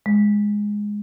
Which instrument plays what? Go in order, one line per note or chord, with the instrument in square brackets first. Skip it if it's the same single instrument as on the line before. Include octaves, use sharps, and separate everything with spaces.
[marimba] G#3